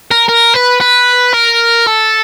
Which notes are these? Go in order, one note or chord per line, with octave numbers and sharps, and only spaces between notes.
A#4
A#4
B4
B4
A#4
A4